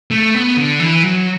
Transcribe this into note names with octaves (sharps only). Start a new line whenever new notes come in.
A3
B3
D3
E3
F#3